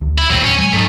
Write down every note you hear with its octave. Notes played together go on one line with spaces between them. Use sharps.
D2
E4
D#2 A2 F#3 C4
C#4
F#3 G#3 G#5
G#2 A3 D#4